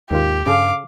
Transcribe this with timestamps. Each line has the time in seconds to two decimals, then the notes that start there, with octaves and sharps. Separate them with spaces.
0.11 D#2 G#2 D#3 F4 G4
0.46 G2 C#3 G#4 A4 F5 D6